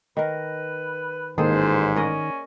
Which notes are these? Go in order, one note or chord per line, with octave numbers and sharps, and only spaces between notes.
D#3 A#4 B4
A1 G#2 D#3 A#3 G#4 A4 C5
C#4 A#4 D5 D#5